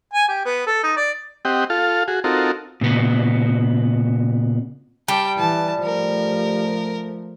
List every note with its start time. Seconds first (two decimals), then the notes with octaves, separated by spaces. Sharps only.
0.14 G#5
0.28 G4
0.45 B3
0.67 A4
0.83 D#4
0.97 D5
1.45 C4 G4 D#5 F#5 G5
1.70 F4 A4 F5
2.08 F#4 G#4
2.24 C4 D#4 F4 F#4 A4 A#4
2.81 A#2 C#3 B3
5.08 G3 G5 A5
5.38 E3 A5
5.84 F3 A3 A#4